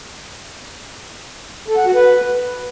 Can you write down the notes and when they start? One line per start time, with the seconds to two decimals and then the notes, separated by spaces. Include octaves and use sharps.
1.68 A4
1.77 F#5
1.86 F#4
1.94 B4